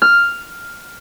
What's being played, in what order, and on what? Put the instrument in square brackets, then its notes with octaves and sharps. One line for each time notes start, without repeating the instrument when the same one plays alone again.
[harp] F6